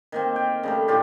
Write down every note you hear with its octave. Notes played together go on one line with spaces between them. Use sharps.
D#3 A#3 C4
G5
C#3 G3 A3
A2 D3 F4 G4